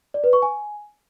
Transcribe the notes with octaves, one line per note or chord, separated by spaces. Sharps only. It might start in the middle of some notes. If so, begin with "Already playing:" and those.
D5
B4
C#6
G#5